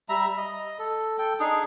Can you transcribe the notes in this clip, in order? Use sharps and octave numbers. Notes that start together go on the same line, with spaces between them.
G3 E5 A#5
D#5
A4
A4 G5
D4 D#4 G#4